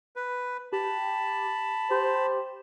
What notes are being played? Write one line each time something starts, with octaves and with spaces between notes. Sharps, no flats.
B4
G4 A5 B5
G4 C5